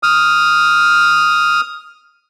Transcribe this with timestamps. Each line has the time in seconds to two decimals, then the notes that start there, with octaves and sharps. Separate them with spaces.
0.03 D#6 F6